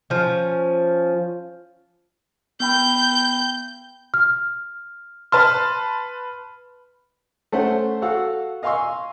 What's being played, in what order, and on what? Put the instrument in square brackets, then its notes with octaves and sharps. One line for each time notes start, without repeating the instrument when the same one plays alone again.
[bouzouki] F3 C#4
[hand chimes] B3 G5 B5 [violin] G6
[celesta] F6
[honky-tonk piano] B4 A5 C6 [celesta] F6
[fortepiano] A3 C#4 C5 E5 F#5
F#4 A4 F5 F#5 E6
D#5 F5 G#5 C6 C#6 E6